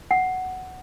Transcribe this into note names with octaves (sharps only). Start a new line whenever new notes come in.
F#5